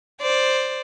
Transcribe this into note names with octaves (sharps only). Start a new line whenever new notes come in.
C5 D5